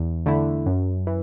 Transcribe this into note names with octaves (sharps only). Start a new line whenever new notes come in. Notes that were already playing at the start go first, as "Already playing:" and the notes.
Already playing: E2
D3 A3 E4
F#2
E3